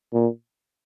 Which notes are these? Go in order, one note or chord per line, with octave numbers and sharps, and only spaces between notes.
A#2